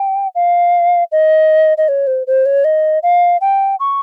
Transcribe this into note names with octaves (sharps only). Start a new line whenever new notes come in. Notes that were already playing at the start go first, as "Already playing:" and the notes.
Already playing: G5
F5
D#5
D#5
C#5
C5
C5
C#5
D#5
F5
G5
C#6